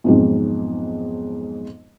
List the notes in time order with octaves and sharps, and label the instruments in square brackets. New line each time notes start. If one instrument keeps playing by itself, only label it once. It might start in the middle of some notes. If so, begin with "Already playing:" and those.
[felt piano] B1 F2 G#2